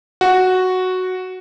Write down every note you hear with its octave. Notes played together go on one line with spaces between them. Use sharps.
F#4